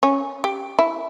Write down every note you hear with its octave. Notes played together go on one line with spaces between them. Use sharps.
C#4
G4
E4